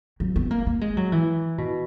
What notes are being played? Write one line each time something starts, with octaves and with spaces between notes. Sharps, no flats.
F#3
B3
A#3
A#3
G#3
F#3
E3
B2